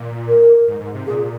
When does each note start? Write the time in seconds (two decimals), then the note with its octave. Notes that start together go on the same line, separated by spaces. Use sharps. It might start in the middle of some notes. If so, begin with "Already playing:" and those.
Already playing: A#2
0.28 A#4
0.68 G#2
0.80 G#2
0.94 C3
1.07 A#2 G#4